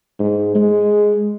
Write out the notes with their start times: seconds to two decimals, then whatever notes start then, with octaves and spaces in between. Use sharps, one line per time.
0.20 G#2
0.55 G#3